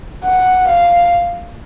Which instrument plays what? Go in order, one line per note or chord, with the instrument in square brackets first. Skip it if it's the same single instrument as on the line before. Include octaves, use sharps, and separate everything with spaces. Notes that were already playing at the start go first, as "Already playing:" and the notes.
[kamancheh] F#5
F5